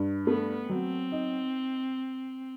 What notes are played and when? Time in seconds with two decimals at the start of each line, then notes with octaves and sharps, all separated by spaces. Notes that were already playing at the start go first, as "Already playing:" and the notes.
Already playing: G2
0.27 A3 B3
0.69 F#3 C4
1.12 D#4